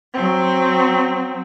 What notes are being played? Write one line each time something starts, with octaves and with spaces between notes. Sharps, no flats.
F#3 C4